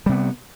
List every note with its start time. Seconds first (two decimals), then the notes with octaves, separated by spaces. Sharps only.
0.06 G3
0.09 C3
0.12 B3